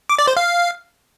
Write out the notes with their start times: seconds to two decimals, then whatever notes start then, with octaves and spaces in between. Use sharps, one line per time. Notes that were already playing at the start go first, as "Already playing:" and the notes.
0.09 D6
0.19 D5
0.28 C5
0.37 F5